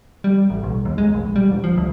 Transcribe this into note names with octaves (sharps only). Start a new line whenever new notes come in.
G3
A1
B1
D#2
G#3
A#1
G3
E1
F3
D2